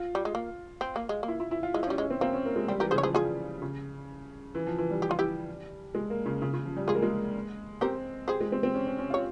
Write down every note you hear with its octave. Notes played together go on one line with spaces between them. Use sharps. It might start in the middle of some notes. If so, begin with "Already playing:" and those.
Already playing: F4
G3
G#3
A#3
C4
A#3
G#3
A#3
E4
E4
E4
F4
G#3 E4
F3
C#4
G3
G#3 C#4
C4
A#3 C4
C#4
A#3
G#3
G3 C4
E3 G4 A#4
C#3 G#4 C5
C#5
F3 G#4 C5
F4 G#4
C#3
E3
F3
E3
G3
G4
F4
E4 G4
G#3
A#3
C#3
C#3
C#3
F3
G3
G#3 F4 G#4
A#3
G#3
C4 G4 A#4
G4 G#4 C5
G#3
C4
C4
C#4
C#4
C#4
F4 C#5